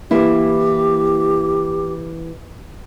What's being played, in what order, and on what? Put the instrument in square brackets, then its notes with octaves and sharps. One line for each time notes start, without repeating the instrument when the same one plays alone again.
[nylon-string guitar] E3 A#3 E4 [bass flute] G4